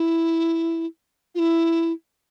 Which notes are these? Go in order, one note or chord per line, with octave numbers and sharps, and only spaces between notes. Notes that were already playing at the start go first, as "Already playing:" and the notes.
Already playing: E4
F4
E4